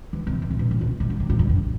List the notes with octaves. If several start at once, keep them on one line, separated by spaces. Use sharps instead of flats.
E3
C3
B2
C3
B2
A2
B2
C3
D3
C3
A2
G2
F2